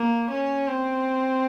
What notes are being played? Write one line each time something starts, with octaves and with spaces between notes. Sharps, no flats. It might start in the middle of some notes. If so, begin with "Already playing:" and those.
Already playing: A#3
C#4
C4